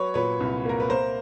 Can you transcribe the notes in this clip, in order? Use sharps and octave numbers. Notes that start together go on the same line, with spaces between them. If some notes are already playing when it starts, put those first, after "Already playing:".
Already playing: F#3 B4 C#5
A#2 B4 C#5
C2
A#3 A#4
B4
A#3 A#4 C5